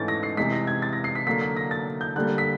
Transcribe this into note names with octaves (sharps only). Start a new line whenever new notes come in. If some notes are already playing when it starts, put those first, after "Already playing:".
Already playing: G#2 E3 A3 C#4 A6
A#6
C7
C3 E3 G#3 B6
A#6
G#6
A6
A#6
C7
B6
D3 F#3 A#3 B6
B6
A#6
A6
G6
D3 G3 A#3 F#6
B6